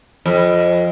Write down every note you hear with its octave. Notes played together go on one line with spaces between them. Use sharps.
F2